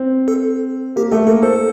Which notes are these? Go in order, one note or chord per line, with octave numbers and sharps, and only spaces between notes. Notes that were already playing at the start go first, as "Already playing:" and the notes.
Already playing: C4
A4
A#3 G4
A3 A4
A#3 A4
A4 C5